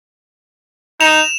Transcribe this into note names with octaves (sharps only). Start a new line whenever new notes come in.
D#4 E7 F7